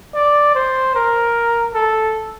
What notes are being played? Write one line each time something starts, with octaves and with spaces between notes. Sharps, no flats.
D5
C5
A#4
A4